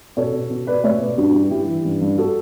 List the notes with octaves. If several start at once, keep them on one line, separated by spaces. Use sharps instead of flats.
B2 A4 C#5
B2
B2
B2 B4 D5
A3 C#5 E5
B2 B4 D5
G2 D4 F#4
F#4
G2 E4 G4
G2 E4 G4
E3
G2
G2
F#4 A4